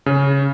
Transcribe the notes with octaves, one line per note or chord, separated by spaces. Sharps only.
C#3